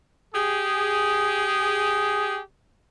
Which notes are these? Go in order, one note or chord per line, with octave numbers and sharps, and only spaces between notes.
G4 G#4